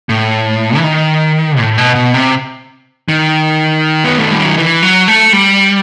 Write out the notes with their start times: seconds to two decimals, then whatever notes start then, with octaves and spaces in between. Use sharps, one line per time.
0.09 A2
0.77 E3
0.84 D#3
1.58 A2
1.78 B2
1.95 B2
2.14 C3
3.09 D#3
4.04 B3
4.18 A3
4.31 G3
4.45 F#3
4.58 E3
4.83 F#3
5.08 A3
5.33 G3